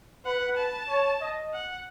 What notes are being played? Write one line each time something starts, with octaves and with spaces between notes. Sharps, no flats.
B4 F#5
A5
C#5
D#5
F#5